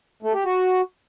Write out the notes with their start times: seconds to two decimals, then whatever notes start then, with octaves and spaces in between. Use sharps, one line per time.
0.23 A3
0.34 G4
0.45 F#4